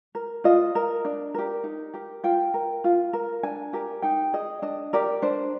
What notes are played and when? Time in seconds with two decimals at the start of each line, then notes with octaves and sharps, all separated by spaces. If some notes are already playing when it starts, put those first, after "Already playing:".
0.15 A#4
0.44 F4 D#5
0.75 A#4
1.05 D4
1.34 G4 A#4
1.64 D#4
1.94 G4 A#4
2.24 F4 G5
2.54 A#4
2.84 F4
3.13 A#4
3.43 D4 G#5
3.73 G4 A#4
4.02 D#4 G5
4.33 G#4 D#5
4.62 D4 D#5
4.93 G4 A#4 D5
5.22 D4 C5